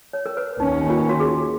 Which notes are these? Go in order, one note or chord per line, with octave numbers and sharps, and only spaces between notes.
C#5
A#4
B4
D#2 D#3 A#3 C#4 D#4
F4
F#4
G#4